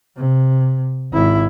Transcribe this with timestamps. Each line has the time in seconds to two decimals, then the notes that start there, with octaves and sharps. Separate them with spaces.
0.17 C3
1.12 G#1 E4